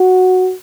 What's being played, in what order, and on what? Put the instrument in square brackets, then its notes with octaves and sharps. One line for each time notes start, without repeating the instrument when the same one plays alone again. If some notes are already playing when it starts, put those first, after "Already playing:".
Already playing: [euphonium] F#4